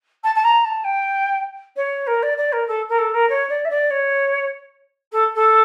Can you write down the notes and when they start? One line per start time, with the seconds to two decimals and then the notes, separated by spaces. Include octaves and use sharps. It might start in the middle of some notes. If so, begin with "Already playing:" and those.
0.23 A5
0.35 A5
0.44 A#5
0.64 A5
0.84 G5
1.76 C#5
2.06 A#4
2.22 D5
2.37 D5
2.52 A#4
2.67 A4
2.88 A#4
2.98 A4
3.13 A#4
3.29 C#5
3.49 D5
3.64 E5
3.70 D5
3.90 C#5
5.12 A4
5.35 A4